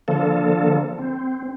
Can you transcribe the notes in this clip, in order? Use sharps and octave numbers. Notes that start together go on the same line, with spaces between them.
D3 F3 A#3 A4
C4